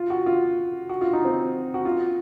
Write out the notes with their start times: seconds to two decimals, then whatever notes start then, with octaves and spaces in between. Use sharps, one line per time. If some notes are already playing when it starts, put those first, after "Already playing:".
Already playing: F4
0.10 F#4
0.26 F4
0.89 F#4
1.01 F4
1.13 D#4
1.25 C4
1.74 F#4
1.85 F4